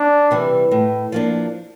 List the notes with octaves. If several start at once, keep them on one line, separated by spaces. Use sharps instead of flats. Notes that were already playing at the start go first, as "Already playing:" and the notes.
Already playing: D4
C3 E3 G3
A2
F3 A#3 D4